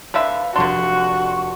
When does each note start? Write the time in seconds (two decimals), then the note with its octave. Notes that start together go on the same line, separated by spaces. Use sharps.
0.14 D3 B4 E5 F5
0.56 F1 D3 D4 F#4 C6 C#6